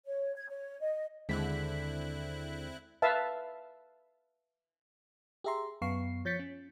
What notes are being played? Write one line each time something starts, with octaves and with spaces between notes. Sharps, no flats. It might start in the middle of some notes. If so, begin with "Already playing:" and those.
C#5
G#6
C#5
D#5
D#2 D3 G#3 C4 E4 F#6 B6
B4 E5 F5 A5
G4 G#4 E5 A#5 C6
F#2 B3 F5 C#6 C7
F3 C#5 G6 A6 B6 C#7
C#4